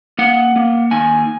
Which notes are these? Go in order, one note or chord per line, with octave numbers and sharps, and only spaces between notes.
A#3 F#5
A#3
D#3 G#5